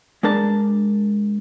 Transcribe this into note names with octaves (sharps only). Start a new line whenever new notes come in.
G#3 D4 A#4 A5